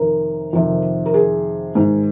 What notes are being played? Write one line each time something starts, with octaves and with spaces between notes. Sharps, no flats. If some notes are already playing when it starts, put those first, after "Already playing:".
Already playing: F2 C3 D#3 A#4
F2 C3 D#3
A#4
G#4
G#2 D#3